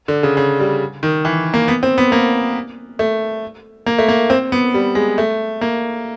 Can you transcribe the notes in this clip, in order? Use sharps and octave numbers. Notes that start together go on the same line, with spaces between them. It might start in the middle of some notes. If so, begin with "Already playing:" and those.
D3
C#3
C#3
G3
D#3
E3
A#3
B3
C4
B3
A#3
A3
A#3
A3
A#3
C4
B3
G3
G#3
A3
A#3